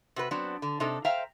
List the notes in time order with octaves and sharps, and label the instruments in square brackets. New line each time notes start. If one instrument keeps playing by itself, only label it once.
[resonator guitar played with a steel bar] C3 F#4 B4
F#3 B3 C4 D4
D3
C3 D4 D#4 A4
C5 E5 F5 G5 A#5